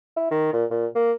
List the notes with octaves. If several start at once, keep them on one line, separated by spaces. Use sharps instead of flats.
E4
D#3
A#2
A#2
A#3